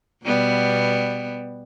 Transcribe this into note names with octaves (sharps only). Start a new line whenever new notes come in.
B2 G3 B3